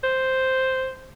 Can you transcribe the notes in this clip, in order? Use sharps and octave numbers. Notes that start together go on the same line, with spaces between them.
C5